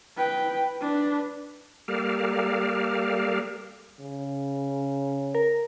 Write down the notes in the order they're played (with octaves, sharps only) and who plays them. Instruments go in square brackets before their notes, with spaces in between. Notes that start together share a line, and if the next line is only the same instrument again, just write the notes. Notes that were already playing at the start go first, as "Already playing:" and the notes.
[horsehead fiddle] B4 G5
D4 B4
[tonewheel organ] G3 A#3 G4 A4 A#4 F5
[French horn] C#3
[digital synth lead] A#4